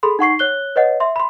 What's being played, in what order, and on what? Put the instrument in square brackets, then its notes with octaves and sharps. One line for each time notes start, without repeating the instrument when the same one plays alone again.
[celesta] G#4 A4 B5 C6
D#4 F#5 C#6 C7
C#5 F#6 G7
B4 C#5 D#5 F#5
E5 C6
B5 C6